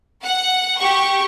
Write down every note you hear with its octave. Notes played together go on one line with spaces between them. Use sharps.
F#5
G4 C#6